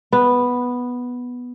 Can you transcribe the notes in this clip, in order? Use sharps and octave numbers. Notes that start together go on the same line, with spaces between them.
B3